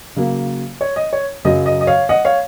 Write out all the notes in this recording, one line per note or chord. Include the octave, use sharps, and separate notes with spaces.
C#3 F#3 A#3
C#5
D#5
C#5
F#2 C#3 F#3 D#5
D#5
D#5
C#5 F5
D#5 F#5
C#5 F5